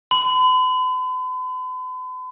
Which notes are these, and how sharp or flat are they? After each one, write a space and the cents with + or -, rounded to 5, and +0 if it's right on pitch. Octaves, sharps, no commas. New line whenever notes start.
B5 +45